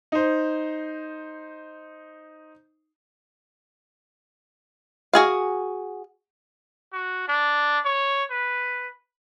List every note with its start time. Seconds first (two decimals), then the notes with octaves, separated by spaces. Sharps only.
0.12 D#4 C5
5.13 F#4 G#4 F5
6.93 F#4
7.28 D4
7.85 C#5
8.30 B4